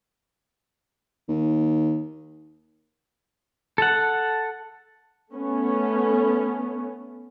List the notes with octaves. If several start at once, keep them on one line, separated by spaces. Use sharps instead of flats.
D#2
A4 F#5
A3 B3 C#4